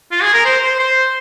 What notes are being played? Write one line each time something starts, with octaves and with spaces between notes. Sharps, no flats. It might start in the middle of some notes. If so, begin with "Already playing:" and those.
F4
G#4
A#4
C5
C5
C5